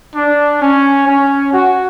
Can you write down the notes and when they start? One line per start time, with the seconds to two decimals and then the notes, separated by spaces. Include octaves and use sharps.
0.15 D4
0.62 C#4
1.08 C#4
1.53 F#4